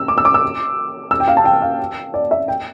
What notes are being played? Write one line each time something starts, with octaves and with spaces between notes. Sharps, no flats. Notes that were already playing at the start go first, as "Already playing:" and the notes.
Already playing: E6
D6
E6
D6
E6
E6
G5
F5
A5
G5
F5
D5
E5
G5